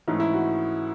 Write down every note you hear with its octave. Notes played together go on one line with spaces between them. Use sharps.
G#2 E3 A3 C#4 D#4
E4
F#4